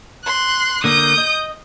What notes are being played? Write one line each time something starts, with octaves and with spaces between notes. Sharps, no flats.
C6 F#6
D3 A#3 D#6 G6
D#5